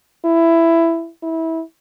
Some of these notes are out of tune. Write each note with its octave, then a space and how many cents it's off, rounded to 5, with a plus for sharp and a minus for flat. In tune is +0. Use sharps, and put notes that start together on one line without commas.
E4 +10
E4 -20